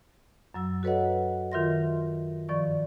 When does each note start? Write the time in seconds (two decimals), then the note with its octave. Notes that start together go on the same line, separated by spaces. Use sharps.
0.54 F#2 F#3 E6
0.83 F#4 A4 B4 C#5 D#5 F#5
1.52 D#3 F4 A#4 E5 C6 A#6
2.49 G2 D#3 F3 D5 C#6